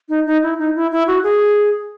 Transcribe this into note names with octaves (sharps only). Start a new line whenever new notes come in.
D#4
D#4
E4
D#4
E4
E4
F#4
G#4